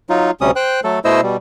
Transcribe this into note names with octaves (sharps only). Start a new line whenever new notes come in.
F#3 D#4 F4
D2 C3 G3 C#4 D#6
C5 G5 F#6
F#3 A3 A4
B2 A3 E4 C5 D#5 E6
B2 G3